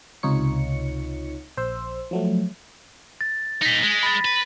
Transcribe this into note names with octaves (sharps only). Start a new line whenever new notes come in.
C#2 C3 D#4 F4 C#5 C#7
A#1 C5 C6 E6
F3 F#3 A3
A6
A#2 D#4 A#6 B6
G#3
B5 A6
B4